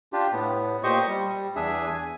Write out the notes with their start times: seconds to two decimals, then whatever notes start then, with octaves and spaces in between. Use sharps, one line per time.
0.13 D4 F4 G4
0.33 A2 B3
0.83 A#2 G4 C5 D#5 C#6
1.08 G3
1.56 E2 D4 G#4 E5
1.86 G#5